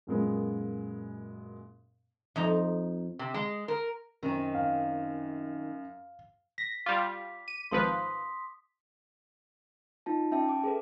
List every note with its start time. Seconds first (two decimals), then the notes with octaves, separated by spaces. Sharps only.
0.07 F#2 A#2 G#3 B3
2.36 F2 D#4 A#5
3.19 C3
3.34 G#3
3.68 A#4
4.23 F#2 D#3 C4 D#4
4.55 F5
6.58 A#6 B6
6.86 G3 F4 D6
7.48 D#7
7.71 G#1 F3 B4 C6 D#6 B6
10.06 D#4 F4 A5
10.32 C#4 E5 G5 A5
10.49 D6
10.64 G#4 A4 B4